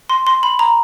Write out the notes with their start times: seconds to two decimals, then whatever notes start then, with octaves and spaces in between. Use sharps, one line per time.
0.09 C6
0.27 C6
0.43 B5
0.59 A#5